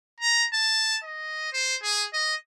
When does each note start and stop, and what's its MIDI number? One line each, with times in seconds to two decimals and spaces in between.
0.20 0.45 82
0.54 0.99 81
1.04 1.51 75
1.52 1.75 72
1.82 2.06 68
2.13 2.35 75